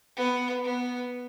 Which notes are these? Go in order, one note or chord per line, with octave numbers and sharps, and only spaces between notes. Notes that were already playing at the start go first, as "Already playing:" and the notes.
B3
B3